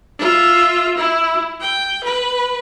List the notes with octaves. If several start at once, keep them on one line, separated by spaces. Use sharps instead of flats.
F4 E5
E4
G5
B4